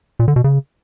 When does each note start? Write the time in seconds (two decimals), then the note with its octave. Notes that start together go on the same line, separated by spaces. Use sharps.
0.19 A#2
0.28 D3
0.36 B2
0.44 C#3